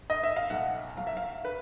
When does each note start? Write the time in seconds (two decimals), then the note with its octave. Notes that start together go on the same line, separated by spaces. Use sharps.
0.10 D#5
0.23 E5
0.36 F5
0.50 B1 F#5
0.97 F#3 F5
1.07 E5
1.17 F5
1.45 B4